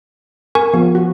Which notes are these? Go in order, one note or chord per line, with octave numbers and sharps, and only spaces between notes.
A#4 G#5 C#6
F3 B3
F#4